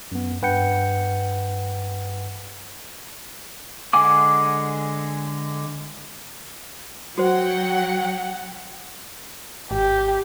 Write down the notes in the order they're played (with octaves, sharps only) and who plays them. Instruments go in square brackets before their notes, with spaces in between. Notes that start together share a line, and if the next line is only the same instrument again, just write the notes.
[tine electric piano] F#2 B3
G2 B4 F#5 G5 G6 C#7
[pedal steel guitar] D3 G#3 F#5 G#5 D6
[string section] F#3 F#5 G5 [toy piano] F#4 C5
[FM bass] G#1 [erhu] G4